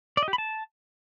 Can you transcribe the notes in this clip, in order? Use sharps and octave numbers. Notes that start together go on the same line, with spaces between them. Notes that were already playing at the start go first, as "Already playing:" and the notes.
D5
D#5
G4
B5
A5